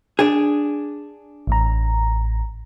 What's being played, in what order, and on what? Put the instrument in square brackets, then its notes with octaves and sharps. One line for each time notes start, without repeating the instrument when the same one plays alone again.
[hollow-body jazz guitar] D4 G#4
[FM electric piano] A1 A2 A#5